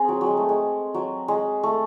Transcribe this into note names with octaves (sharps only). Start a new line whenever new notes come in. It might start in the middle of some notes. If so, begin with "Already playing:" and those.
Already playing: C4 G#4
F#3
F#3
G#3
A3
G#3
F#3
G#3
A3